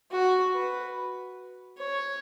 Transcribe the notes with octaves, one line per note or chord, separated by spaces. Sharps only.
F#4
B4
C#5